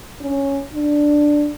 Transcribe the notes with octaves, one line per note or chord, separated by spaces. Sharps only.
C#4
D4